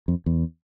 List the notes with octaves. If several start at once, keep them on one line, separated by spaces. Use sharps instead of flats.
F2
E2